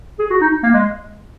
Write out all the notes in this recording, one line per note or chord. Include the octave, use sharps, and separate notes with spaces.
G#4
F#4
D#4
A#3
G#3